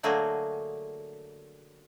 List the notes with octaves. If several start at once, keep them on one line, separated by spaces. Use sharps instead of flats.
D3 F#3 A3 A#3 G#4